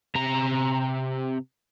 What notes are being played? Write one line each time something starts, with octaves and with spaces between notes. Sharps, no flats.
C3 A#5